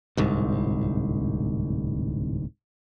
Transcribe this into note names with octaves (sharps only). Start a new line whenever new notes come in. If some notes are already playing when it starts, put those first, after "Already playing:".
D1 C2 G#2